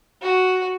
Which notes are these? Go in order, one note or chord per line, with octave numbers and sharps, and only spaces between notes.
F#4